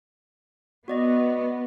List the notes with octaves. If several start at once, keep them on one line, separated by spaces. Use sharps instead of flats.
B3 F#4 D5 D#5